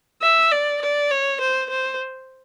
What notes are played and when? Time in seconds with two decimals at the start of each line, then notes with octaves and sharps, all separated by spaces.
0.23 E5
0.52 D5
0.82 D5
1.11 C#5
1.41 C5
1.70 C5